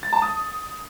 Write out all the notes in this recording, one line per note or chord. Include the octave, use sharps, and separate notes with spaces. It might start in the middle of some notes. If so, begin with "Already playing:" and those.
A6
A5
D#6